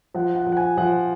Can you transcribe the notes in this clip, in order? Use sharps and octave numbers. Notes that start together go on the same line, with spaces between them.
F3 F#5
F#5
F3
F#5
G#5
F3 F#5